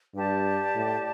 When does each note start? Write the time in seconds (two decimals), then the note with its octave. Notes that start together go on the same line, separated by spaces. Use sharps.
0.14 G2 G4 D5 A5
0.75 A2